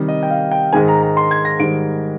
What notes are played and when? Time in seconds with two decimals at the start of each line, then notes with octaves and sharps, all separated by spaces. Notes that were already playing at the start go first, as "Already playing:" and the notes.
Already playing: C3 D#3 G3
0.08 D#5
0.23 G5
0.31 F5
0.51 G5
0.73 G#2 D#3 G#3 G#5
0.88 A#5
1.03 A#5
1.17 C6
1.31 G#6
1.45 A#6
1.60 G#2 D#3 G3 D7